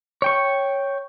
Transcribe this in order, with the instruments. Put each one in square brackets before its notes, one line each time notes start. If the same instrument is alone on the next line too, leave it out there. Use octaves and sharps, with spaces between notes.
[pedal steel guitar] C#5 G5 C#6